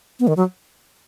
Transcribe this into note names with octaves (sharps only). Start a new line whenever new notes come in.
B3
D#3
F#3